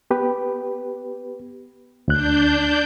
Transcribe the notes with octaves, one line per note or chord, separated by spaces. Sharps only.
B3 G4 B4
D2 D4 F#6 G6